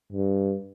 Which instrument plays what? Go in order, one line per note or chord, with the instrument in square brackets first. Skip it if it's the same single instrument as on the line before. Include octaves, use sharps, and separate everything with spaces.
[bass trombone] G2